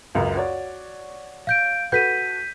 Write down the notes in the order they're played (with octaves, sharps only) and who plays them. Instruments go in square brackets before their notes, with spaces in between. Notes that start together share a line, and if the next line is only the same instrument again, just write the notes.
[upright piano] C#2 F#2
F#4 C#5 D5
[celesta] F5 G6 D7
[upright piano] F#4 A4 B4 [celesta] G6 B6 D#7